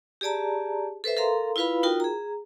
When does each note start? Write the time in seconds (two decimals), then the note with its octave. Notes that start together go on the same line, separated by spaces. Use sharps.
0.21 G4 G#4 D5 A5 A#5
1.04 A4 B4 C5 E5
1.17 A4 A#4 F5 A#5 C6
1.56 E4 F4 B4 F5 B5
1.83 D#4 F4 F#4 A#4 G5
2.00 G#4 A#5